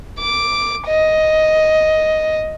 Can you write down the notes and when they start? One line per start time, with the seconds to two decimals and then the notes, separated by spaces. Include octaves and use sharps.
0.19 D6
0.87 D#5